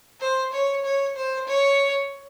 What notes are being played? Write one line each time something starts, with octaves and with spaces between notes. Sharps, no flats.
C5
C#5
C#5
C5
C#5